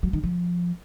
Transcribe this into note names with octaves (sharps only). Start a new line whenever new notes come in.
F#3
D#3
F3